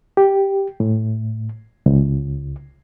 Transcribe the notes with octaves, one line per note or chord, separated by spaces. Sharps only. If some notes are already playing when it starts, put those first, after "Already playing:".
G4
A2
C#2